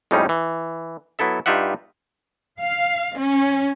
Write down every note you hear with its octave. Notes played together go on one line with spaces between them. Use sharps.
F2 A2 G3 G#3 C#4 D#4
E3
F#3 B3 E4 A4 E5
G2 D#4 F4 G4 E5 F#5
F5
C#4